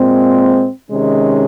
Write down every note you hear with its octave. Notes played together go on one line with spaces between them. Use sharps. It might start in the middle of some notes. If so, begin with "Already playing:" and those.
Already playing: A#2 G#3 C4
C3 D#3 G#3 C#4